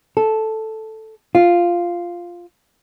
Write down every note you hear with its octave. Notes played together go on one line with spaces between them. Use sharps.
A4
F4